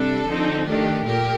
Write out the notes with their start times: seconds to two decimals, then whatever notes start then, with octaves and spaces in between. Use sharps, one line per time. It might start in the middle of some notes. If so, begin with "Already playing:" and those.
Already playing: C3 G3 D4 A4
0.27 D3 F3 C4 D#4
0.67 D#3 A3 D4 G4
1.06 A#2 G4 A#4